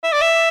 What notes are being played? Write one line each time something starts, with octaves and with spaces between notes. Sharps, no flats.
E5
D5
E5